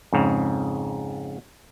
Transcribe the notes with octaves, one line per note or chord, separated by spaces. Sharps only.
F2 G#2 C#3